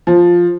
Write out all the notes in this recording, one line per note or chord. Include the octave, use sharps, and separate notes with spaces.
F3